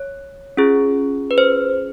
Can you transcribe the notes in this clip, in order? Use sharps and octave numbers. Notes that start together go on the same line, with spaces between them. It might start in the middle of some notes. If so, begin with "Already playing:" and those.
Already playing: C#5
C#4 F4 G#4
B4
C5